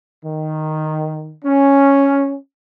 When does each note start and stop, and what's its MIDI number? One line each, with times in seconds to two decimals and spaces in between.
0.24 1.35 51
1.44 2.36 61